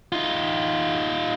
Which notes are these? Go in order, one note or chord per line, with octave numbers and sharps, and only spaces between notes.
D#4 F4